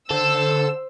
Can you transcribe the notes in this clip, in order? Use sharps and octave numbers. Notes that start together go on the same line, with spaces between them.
D3 A4 C5 E6